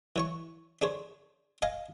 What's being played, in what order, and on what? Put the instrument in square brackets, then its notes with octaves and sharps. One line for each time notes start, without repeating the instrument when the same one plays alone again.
[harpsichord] E3 C#5 C#6
D4 G#4 C5 C#5
D#5 F5 G#5 A#5